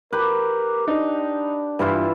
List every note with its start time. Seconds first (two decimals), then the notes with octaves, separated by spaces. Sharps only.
0.13 G4 A#4 B4
0.88 D4 D#4
1.79 G2 E3 E4 F4